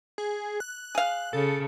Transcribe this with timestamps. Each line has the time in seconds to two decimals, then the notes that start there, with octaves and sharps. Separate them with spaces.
0.18 G#4
0.60 F#6
0.95 G#4 F5
1.33 C#3 A4